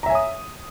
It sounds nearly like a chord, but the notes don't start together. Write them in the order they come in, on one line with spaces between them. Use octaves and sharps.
A#5 E5 G#5 C#5 D#6